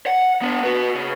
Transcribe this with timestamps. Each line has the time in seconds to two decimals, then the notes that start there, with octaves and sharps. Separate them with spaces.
0.07 F#5
0.42 B3 D4
0.63 F#4 B4
0.95 C#3